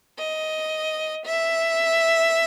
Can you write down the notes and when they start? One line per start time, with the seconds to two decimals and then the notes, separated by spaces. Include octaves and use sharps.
0.19 D#5
1.25 E5